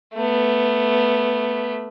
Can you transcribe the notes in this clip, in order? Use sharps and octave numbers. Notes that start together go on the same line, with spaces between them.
A3 B3